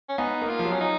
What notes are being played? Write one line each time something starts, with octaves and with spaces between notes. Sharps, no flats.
C#4
B3 D#4
A#3
F4
F3
F#3
C#4
D#4